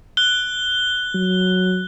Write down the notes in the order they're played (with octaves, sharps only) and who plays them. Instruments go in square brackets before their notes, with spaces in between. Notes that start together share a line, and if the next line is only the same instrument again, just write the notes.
[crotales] F#6 G7
[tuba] F#3